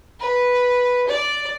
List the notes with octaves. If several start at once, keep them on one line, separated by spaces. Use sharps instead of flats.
B4
D5